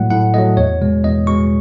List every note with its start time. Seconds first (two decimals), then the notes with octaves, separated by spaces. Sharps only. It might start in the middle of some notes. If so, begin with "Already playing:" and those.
Already playing: A2 F#3 A3 F#5
0.11 A2 F#5
0.34 F#3 A3 D#5
0.57 E2 C#5
0.81 B2 G#3
1.04 E2 D#5
1.27 B2 G#3 C#6